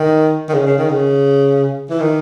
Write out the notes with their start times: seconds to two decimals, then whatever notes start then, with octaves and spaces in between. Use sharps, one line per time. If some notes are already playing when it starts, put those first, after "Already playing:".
Already playing: D#3
0.49 D#3
0.54 C#3
0.67 C#3
0.78 D#3
0.90 C#3
1.90 E3
2.00 D#3